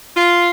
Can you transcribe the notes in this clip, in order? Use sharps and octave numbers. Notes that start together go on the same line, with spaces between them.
F4